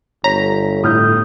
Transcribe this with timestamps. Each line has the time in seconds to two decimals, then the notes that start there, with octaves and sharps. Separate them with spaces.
0.24 G1 C#5 A#5 B6
0.84 A2 D#6 F6 G6